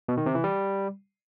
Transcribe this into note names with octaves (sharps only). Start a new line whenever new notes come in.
B2
D#3
C3
E3
G3